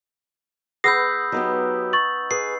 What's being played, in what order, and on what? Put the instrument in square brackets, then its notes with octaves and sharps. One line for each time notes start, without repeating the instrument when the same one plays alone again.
[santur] B3 B4 [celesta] G#4 A#6 C7 [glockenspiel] D#6 E6 G6
[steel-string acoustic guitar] F#3 B3 G4 [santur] D#4
[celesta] C#6 A6 F#7
[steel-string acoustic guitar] G#4 B4 [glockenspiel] C7